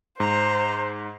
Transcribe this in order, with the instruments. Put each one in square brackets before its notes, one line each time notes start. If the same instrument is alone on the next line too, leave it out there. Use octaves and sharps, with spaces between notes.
[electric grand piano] G#2 [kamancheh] C5 [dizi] A#5